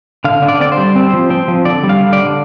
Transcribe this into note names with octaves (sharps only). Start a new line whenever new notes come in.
D3 F5
D3
D5
C4 D5
C5
G3
C4
F3
C4
F3
D3 D5
G3
F5
D3
D5
D3